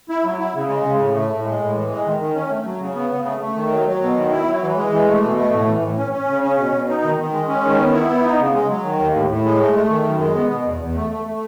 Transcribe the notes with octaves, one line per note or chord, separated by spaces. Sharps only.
E4
F#3
E4
C#3
G#3
C#3
A2
A3
A2
G#3
A2
E3
G#3
D#3
D#3
C#4
A3
F#3
C#3
B3
C#3
A3
A3
D#3
F#3
F#3
B2
D#3
E4
F#3
E3
G#3
E3
A3
B2
A3
A2
E3
A2
C#4
C#4
C#3
C#4
B2
B2
D#4
D#3
D#3
G#3
C#4
D#3
B3
E4
B3
D#4
C#3
G#3
F#3
D#3
D#2
A2
A2
G#3
A3
A3
D#3
F#2
G#3
B3
B2
E2
E2
A3
A3
A3